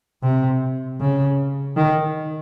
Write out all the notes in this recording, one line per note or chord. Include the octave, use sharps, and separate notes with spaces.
C3
C#3
D#3